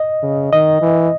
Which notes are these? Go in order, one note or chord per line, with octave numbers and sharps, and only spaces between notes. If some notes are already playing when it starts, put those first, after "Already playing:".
Already playing: D#5
C#3
D#3 D#5
E3